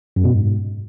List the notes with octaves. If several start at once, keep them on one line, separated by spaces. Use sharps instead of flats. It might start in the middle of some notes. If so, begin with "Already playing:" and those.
F#2
B2
G#2